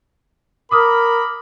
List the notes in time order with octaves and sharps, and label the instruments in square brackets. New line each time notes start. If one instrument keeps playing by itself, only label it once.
[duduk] A#4 [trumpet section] B5 [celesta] D6 D#6 F6